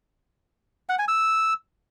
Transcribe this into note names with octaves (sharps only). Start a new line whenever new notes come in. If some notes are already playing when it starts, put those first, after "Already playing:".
F#5
G#5
E6